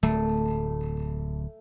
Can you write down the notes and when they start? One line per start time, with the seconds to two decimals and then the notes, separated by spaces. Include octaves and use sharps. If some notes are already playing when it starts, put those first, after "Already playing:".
0.03 D1 A3